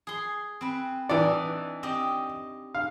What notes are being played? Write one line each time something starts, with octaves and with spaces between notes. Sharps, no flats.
G#4 C6
C4 B4
E3 D4 D#4 D5
C4 G4 D#5
F5